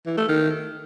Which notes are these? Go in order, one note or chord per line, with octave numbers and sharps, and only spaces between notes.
E3
A3
D#3